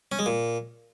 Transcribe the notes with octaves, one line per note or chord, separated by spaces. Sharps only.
C#4
G#3
A#2